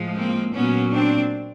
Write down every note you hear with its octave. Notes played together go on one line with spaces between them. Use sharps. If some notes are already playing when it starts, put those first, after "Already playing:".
Already playing: A2 F3 G#3
A#3 C4
A#2 F#3 A#3 B3 C#4
C4 D4